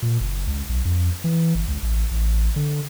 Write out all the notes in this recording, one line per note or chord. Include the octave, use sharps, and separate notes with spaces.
A#2
F#1
C#2
B1
F2
E3
G1
C#2
A1
A1
D3